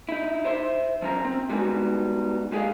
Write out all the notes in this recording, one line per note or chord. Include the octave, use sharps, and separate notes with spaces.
D#4 E4
C5 E5 C6
F3 F#3 C#4 C5 D#5 A#5
C4
G3 G#3 B3 C#4 D#4 F#4
G#3 G4 G#4 D#5 F5